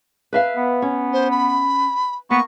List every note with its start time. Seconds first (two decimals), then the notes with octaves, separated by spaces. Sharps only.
0.33 B4 E5 F5
0.56 B3
0.82 C#4
1.13 C5
1.31 B5
2.30 A#3 B3 C#6